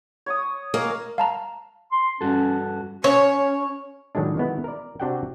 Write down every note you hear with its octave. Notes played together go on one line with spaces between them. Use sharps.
C#5 C#6 D#6
A#3 D#5 G#5
F5 A5 A#5
C6
G2 C#4 F#4 A4
C#4 C#5
A2 D#3 F#3 G#3 D4
D#3 G#3 B3 E4
A#4 D5
C3 D4 F#4 G4 F#5 G5